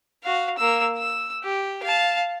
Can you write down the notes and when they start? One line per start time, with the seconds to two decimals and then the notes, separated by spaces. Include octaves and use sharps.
0.24 F#4 F5
0.57 A#3 E6
0.97 E6
1.43 G4
1.83 F5 A5